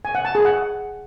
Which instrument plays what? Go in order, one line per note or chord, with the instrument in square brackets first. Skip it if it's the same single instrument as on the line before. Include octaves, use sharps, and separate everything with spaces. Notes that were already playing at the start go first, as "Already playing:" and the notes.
[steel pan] G#5
F#5
A5
G#4
F#5